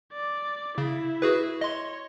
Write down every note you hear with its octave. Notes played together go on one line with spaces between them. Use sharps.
D5
C#3 E4
F#4 G#4 B4
C#5 D#5 C6